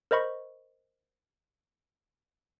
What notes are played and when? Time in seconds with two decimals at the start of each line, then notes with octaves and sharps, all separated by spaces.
0.11 A#4 C5 D#5 B5 C#6